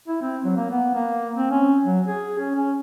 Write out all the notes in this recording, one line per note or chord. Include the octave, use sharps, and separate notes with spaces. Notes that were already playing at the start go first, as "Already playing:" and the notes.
E4
C4
F#3
A#3
B3
A#3
C4
C#4
F#3
G#4
C#4
C#4